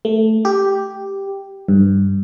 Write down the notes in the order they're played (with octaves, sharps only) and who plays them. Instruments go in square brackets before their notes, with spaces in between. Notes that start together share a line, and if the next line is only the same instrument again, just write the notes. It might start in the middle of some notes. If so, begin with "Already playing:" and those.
[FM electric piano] A3
G4
G2